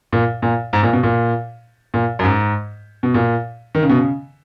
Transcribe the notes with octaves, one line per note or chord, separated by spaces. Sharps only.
A#2
A#2
G#2
A#2
B2
A#2
A#2
F#2
G#2
B2
A#2
D#3
C#3
B2
C#3